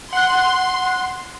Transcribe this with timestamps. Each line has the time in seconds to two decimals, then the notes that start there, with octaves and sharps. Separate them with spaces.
0.13 F#5 C6 F#6